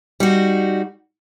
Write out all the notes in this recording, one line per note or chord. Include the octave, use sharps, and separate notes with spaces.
G3 D#4 F#4